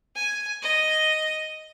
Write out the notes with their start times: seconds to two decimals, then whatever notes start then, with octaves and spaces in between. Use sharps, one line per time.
0.16 G#5
0.62 D#5